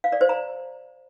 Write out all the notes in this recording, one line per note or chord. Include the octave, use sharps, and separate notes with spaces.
F5
D5
C5
A#5